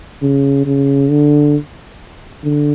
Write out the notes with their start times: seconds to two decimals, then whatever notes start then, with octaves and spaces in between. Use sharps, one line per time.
0.22 C#3
0.66 C#3
1.10 D3
2.44 D3